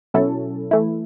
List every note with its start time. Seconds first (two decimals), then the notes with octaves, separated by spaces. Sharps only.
0.14 B2 F#3 C#4 E4 A4
0.71 E3 A3 E4